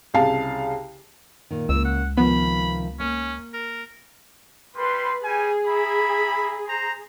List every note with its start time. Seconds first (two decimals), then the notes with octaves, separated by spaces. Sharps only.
0.14 C2 C#3 F5 A5
1.51 A#2 D#3
1.69 C#2 C#3 A#3 E6
1.85 F#5
2.18 C3 D#3 F3 B3 B5
3.00 A#3 C#4
3.54 A#4
4.76 G3 B4 C6
5.23 G3 G#4 G#5
5.66 E4 A#5 B5
6.68 C5 A#5